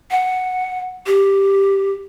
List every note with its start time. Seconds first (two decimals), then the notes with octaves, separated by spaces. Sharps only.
0.11 F#5
1.06 G4